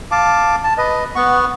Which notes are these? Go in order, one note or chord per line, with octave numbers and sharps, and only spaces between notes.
F5 A5 D6
A5
B4 D#5
B3 F#5 C#6